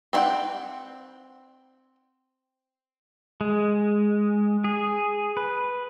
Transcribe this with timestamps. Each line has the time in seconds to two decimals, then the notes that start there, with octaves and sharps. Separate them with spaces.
0.13 C4 C#4 E4 F#5 G5
3.41 G#3
4.64 G#4
5.37 B4